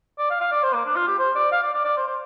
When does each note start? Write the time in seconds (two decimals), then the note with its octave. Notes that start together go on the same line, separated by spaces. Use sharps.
0.19 D5
0.30 F5
0.40 F5
0.52 D5
0.63 C5
0.74 A#3
0.85 D4
0.96 F4
1.07 G4
1.19 C5
1.35 D5
1.52 F5
1.62 D5
1.74 D5
1.85 D5
1.97 C5
2.07 C5